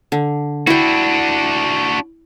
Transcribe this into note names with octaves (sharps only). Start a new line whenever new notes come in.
D3
D4 E4 F#4 G5